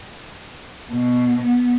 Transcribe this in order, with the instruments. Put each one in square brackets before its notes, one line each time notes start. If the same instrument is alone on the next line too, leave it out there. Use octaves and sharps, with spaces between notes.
[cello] B2
B3